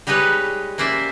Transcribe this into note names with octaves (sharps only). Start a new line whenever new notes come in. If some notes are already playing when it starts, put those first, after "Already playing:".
G3 G#3 D#4 G4 B4 C#5
A#3 C#4 C5 D5 E5